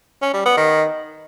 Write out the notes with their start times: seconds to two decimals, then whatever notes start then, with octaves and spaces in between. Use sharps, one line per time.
0.22 C#4
0.33 G3
0.45 B3
0.57 D#3